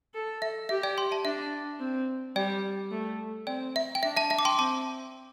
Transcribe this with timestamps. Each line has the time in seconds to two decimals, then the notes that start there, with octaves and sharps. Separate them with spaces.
0.14 A4
0.42 E5
0.69 G4 E5
0.83 D5 G5
0.98 G5 C6
1.11 E5 A5
1.25 D4 E5
1.80 C4
2.36 G3 D5 G5
2.91 A3
3.47 C4 D5 G5
3.76 E5
3.95 G5
4.03 D4 E5
4.17 E5 A5
4.30 E5 A5
4.39 D6
4.45 G5 C6
4.59 C4 A5 D6